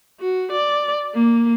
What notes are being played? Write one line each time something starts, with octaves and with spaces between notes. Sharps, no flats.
F#4
D5
A#3